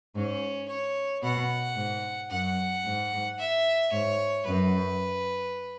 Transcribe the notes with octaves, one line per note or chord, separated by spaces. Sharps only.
G#2 C#4
C#5
B2 F#5
G#2
F#2 F#5
G#2
E5
G#2 C#5
F#2 B4